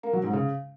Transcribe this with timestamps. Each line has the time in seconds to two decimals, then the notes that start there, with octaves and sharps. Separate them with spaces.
0.03 A#3
0.13 F#3
0.23 G#2
0.33 C#3